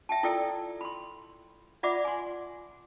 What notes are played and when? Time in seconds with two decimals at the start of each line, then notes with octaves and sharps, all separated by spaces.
0.09 E5 G5 A5
0.23 E4 F4 A4 D5 G5 E6
0.81 B5 C6
1.83 F4 D5 E5 F#5 B5 D6
2.05 G#5 C6